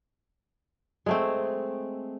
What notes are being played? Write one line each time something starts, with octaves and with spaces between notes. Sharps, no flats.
G#3 A3 C4